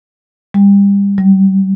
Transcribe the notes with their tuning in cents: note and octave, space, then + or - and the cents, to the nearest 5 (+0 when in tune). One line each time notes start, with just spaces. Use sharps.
G3 +30
G3 -30